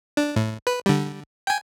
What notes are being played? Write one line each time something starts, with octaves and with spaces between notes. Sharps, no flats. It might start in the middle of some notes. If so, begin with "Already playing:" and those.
D4
A2
B4
D3 G3
G5 G#5